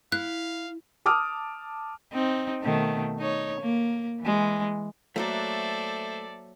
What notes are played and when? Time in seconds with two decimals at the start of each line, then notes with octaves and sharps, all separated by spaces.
0.12 E4 F5 F#6
1.06 A5 D6 D#6 F6
2.13 C4 D#4
2.62 B2 D#3 A3
3.19 D#4 C#5
3.60 A#3
4.21 E3 G#3
5.16 F#3 A3 A#3 F#4 A4 C5 D5 E5